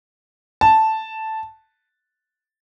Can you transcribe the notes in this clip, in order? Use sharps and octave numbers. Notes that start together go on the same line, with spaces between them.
A5